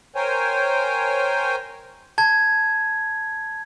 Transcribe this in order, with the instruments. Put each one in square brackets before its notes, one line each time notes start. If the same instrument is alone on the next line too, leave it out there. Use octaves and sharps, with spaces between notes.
[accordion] A#4 C5 C#5 G5 G#5
[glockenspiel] A5 G#6